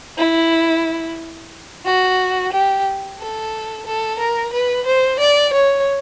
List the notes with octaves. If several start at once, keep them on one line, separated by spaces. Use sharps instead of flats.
E4
F#4
G4
A4
A4
A#4
B4
C5
D5
C#5